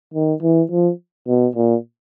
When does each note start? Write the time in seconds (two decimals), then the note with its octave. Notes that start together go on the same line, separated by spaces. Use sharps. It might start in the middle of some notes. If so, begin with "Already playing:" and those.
0.14 D#3
0.43 E3
0.71 F3
1.28 B2
1.56 A#2